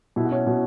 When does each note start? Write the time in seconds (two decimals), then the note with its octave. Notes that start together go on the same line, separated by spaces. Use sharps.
0.16 B2 E4
0.25 F#4
0.32 C#4 E4
0.47 B2